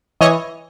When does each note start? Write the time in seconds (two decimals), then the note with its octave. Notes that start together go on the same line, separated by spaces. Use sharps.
0.21 E3 C#5 D#5